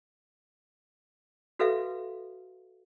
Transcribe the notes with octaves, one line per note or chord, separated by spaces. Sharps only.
F#4 A4 B4 E5 F5